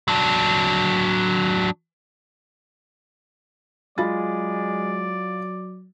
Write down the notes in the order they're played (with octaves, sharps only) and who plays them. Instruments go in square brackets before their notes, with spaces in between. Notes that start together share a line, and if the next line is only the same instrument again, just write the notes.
[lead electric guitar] F#3 D4
[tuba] F#3 [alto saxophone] G#3 [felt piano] F4 B5 A6 [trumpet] D5